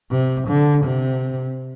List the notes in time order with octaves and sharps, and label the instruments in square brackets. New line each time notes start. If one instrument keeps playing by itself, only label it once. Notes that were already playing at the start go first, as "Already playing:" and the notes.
[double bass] C3
D3
C3